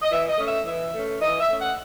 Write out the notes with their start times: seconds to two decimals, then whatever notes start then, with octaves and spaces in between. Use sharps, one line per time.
0.02 D#5
0.10 E3 E5
0.29 D#5
0.38 A3 C#4
0.47 E5
0.66 E3 E5
0.94 A3 C#4
1.21 E3 D#5
1.40 E5
1.49 A3 C#4
1.58 F#5